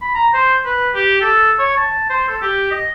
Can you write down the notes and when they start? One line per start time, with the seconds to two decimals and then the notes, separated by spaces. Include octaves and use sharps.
0.02 B5
0.15 A#5
0.34 C5
0.66 B4
0.95 G4
1.21 A4
1.59 C#5
1.77 A5
2.10 C5
2.28 A4
2.42 G4
2.71 D#5